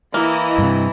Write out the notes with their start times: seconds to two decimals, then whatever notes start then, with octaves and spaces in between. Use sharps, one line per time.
0.14 E3 A#3 E4 D#5 A#5
0.58 G2 C3